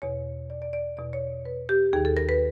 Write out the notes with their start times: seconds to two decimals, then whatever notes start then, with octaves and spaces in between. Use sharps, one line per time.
0.02 E2 B2 C#5
0.50 D5
0.62 D5
0.73 D5
0.97 E2 B2 D5
1.13 C#5
1.45 B4
1.69 G4
1.93 D#2 D#3 G#4
2.05 A4
2.17 A#4
2.29 B4